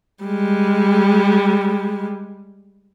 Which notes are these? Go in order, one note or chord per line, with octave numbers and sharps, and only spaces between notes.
G3 G#3